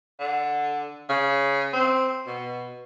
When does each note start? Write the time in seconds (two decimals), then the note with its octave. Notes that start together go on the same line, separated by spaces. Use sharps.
0.19 D3
1.09 C#3
1.73 C4
2.26 B2